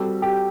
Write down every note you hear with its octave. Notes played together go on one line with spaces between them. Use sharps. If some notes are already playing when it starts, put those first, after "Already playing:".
Already playing: G3 C4 F#4 A4
G4